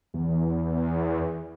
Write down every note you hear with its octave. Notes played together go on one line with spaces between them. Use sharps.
E2